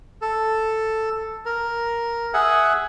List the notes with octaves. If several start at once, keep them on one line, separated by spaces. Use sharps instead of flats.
A4
A#4
G#4 E5 F#5 G#5